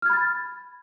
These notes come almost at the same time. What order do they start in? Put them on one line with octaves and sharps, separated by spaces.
F6 G#6 B5 A6